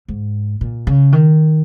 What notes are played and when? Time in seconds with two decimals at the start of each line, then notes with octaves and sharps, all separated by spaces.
0.08 G#2
0.61 A#2
0.87 C#3
1.12 D#3